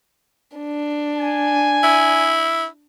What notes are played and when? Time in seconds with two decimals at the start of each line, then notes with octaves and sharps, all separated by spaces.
0.57 D4
1.17 G#5
1.83 E4